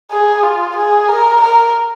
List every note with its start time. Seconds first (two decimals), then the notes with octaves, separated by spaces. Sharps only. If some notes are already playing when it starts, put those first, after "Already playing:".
0.11 G#4
0.43 F4
0.77 G#4
1.09 A#4
1.41 A#4